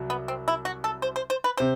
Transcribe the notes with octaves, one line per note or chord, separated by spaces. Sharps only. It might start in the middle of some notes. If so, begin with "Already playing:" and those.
Already playing: C2 F#3
B3
C4
E4
F#4
A4
C5
C5
C5
B4
C3 C5